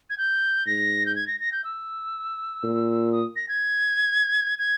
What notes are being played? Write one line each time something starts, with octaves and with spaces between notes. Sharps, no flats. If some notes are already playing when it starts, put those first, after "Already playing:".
G#6
G6
G#2 A#6
G6
G#6
A#6
A#6
G6
E6
A#2
D#6
A#6
G#6
G#6